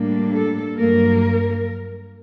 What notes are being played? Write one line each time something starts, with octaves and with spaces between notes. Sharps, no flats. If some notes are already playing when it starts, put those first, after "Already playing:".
Already playing: A2 G3 A#3 D4
A4
G2 F#3 A#3 A#4